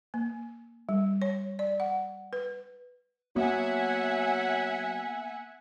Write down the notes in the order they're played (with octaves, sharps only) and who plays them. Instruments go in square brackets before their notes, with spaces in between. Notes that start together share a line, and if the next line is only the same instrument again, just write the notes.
[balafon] A#3
G3
C#5
D5
F#5
B4
[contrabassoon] F#3 [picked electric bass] A#3 B3 [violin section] E5 F#5 G#5